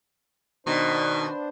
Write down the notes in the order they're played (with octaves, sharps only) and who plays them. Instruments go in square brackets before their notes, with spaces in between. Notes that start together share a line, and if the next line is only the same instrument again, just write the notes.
[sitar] B2 [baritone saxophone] D#3 [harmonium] D4 C5